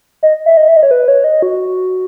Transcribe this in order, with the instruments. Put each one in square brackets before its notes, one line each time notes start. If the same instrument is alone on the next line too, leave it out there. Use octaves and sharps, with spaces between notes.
[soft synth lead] D#5
E5
D#5
E5
D#5
C#5
B4
C#5
D#5
F#4